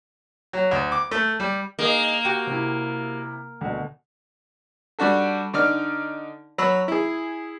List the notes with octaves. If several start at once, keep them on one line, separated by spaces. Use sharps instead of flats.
F#3
D2
D6
A3
G3
A#3 D#4 G#4 D#5
F#4 G4 G5
C3 E4
D2 B2
G3 D4 F#4 A4
D3 D#4 D5 F6
F#3 B5 E6
E4 G#4